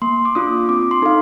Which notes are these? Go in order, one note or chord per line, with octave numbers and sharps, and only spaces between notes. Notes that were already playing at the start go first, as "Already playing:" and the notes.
A#3 C6
D6
D4 F4 D#6
C4 D6
C6
D#4 A4 F5